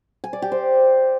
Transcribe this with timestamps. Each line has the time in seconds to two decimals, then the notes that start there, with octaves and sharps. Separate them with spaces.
0.24 G#5
0.33 D5
0.42 G4
0.52 C5